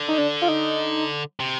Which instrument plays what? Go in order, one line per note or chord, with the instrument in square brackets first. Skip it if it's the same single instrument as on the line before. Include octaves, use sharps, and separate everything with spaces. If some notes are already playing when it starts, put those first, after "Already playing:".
Already playing: [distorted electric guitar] D3
[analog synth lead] D#4
D4
F4
D#4
[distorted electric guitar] C3